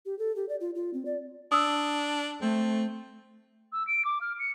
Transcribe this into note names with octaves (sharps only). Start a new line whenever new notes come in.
G4
A4
G4
D5
F4
F4
C4
D5
D4 D#6 E6
A3 C4
E6
D7
D6
F6
C#7